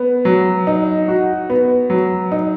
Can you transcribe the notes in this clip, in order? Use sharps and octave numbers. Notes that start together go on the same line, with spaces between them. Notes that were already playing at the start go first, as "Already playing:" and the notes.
Already playing: B3
F#3
D#4
F#4
B3
F#3
D#4